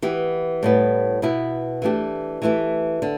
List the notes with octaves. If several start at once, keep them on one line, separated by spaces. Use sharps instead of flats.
E3 B3 G4
A2 G3 B3
B2 B3 E4
E3 A3 D4 G4
E3 A3 E4 G4
D3